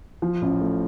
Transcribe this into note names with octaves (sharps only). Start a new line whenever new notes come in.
F3
A1
A3